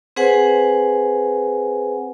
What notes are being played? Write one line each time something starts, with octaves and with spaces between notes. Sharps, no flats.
C4 G#4 B4 C5 F#5 G#5